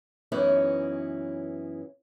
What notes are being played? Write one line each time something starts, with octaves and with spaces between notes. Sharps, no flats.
F#2 E3 B3 C#4 D#4 E4